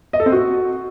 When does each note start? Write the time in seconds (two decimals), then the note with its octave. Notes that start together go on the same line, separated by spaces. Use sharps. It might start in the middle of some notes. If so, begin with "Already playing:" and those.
0.13 D#5
0.20 A4
0.26 C4
0.32 F#4